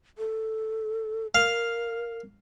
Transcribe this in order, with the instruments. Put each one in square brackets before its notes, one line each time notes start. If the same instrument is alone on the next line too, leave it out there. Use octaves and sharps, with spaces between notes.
[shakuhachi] A4
[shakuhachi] A#4 [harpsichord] F5